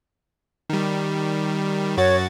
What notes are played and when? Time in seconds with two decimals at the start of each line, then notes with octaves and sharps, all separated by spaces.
0.70 D#3 G3
1.97 F#2 F#4 C#5 A6